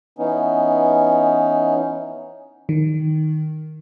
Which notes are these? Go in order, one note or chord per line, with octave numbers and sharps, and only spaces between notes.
E3 B3 C#4 D#4
D#3